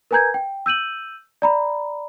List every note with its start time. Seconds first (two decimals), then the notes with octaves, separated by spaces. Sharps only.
0.11 A#4 B4 G#5 A#5 G6 G#6
0.34 G5
0.66 E6 G6 D#7 F#7
1.42 D5 A#5 B5